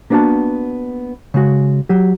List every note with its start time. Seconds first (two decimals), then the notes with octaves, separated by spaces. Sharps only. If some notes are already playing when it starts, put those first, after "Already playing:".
0.10 A#3 B3 D4 E4 F#4 A5
1.34 C#3 G#3 F#4
1.89 F#3 G4